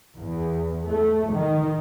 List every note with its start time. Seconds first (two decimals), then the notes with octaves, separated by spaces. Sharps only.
0.18 E2
0.87 A3
1.31 D#3